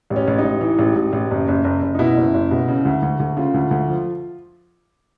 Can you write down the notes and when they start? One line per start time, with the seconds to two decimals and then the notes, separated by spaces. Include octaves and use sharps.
0.10 A1
0.16 C#4
0.27 A1
0.38 D#4
0.44 A1
0.61 E3
0.79 A1
0.96 A1
1.13 A1
1.31 F#1
1.48 F#1
1.64 F#1
1.82 F#1
1.95 D#4
1.99 B2 E4
2.17 F#1
2.34 F#1
2.51 B2
2.68 C#3
2.85 D2
3.02 D2
3.20 D2
3.37 C#3 F4
3.54 D2
3.71 D2
3.88 F3